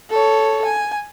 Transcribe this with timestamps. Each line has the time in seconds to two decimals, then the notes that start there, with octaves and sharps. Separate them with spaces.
0.10 A4 C#5
0.65 G#5